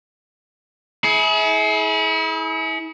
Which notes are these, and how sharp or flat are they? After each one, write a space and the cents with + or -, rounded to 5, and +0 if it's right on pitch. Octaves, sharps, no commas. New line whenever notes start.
E4 -35 G#4 +30